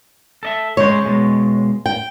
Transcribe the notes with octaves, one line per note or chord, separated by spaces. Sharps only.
A4 D#5 E5
C#3 G#3 C5 C#5
B2 G#3
G5